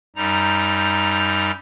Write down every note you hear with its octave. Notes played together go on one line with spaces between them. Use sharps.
F#2 G3 D#4 A#5